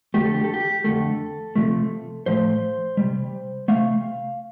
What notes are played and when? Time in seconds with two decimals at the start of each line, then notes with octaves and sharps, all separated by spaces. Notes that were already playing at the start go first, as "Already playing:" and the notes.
0.14 F2 D3 A3 G4
0.24 A4
0.34 G4
0.44 A4
0.54 G4
0.84 F2 D3 A3 A4
1.56 C3 F3 A3
2.26 A2 F3 A3 C5
2.97 C3 G3
3.68 C3 A3 F5